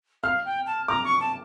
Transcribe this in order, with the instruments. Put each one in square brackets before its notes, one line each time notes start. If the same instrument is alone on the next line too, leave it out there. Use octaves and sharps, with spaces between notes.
[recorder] F5 [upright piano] F6
[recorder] G5
A5
[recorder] A#5 [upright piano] D6
[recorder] C#6
A5